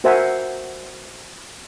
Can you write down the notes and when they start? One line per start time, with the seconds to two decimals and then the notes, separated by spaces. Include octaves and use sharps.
0.04 F#4 A#4 C5 E5 F#5 G#5